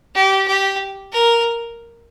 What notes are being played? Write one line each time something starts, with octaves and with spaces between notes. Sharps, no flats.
G4
G4
A#4